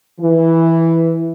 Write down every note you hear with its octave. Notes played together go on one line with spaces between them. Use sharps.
E3